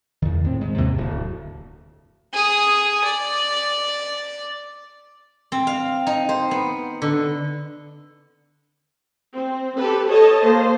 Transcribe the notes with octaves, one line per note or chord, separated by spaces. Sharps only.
E2 D#3
A2 C4
G#2
D#2 C3 A#3
D1
G#4 D#6
D5
C4
F5
D#4
C5
B3
D3
C4
G4 A4 B4
A4 C#5 D#5 A5
A#3 C5